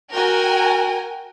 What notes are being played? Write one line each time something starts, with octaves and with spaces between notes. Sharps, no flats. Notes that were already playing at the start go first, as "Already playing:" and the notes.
F#4 A#4 G5 G#5